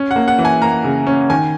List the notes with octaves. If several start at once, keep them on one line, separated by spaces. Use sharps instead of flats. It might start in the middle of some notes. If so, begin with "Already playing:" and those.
Already playing: C#4
F#5
A#3
F#5
E3
G#5
A#3 A#5
C#3
C#4
D#3 G#5